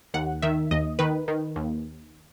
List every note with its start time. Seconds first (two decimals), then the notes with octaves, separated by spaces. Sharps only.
0.14 D#2 F#5
0.42 D#3 E5
0.71 D#2 D#5
0.99 D#3 B4
1.28 D#3
1.56 D#2